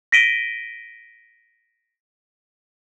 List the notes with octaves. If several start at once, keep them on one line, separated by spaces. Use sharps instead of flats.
A#6 B6 D7 D#7 G7